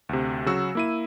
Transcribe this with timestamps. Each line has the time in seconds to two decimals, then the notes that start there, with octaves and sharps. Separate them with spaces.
0.09 D2 C3
0.46 C#3 F#3 F#4 E6
0.75 A#3 E4 D#7